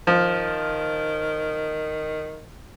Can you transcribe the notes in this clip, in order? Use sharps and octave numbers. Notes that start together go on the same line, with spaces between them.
D#3 F3